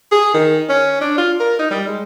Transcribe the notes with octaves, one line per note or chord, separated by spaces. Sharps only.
G#4
D#3
C#4
D4
F4
A#4
D#4
G3
G#3